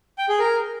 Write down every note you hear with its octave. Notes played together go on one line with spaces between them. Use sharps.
G5
G#4
A#4